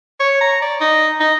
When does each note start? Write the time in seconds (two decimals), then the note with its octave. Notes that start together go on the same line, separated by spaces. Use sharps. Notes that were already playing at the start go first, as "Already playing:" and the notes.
0.20 C#5
0.41 A#5
0.62 D5
0.81 D#4
1.20 D#4